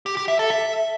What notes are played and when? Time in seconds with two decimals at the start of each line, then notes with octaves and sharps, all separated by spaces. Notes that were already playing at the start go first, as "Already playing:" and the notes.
0.06 G4
0.17 G4
0.28 E5
0.39 A4
0.50 E5